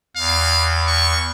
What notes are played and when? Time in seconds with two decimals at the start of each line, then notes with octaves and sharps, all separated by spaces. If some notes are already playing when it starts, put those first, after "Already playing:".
0.16 E2 F5
0.87 C#6